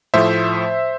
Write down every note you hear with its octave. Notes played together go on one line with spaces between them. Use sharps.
A2 F3 A3 C5 E5